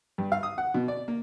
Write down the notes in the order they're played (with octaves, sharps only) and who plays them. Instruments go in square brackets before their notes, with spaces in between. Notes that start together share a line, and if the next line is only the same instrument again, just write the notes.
[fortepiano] G2
F5
D#6
F#5
B2
D5
A#3